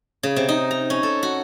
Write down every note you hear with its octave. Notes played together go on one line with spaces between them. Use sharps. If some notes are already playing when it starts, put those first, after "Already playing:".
C#3
C3
D#4
A#5
C#4
A4
F#4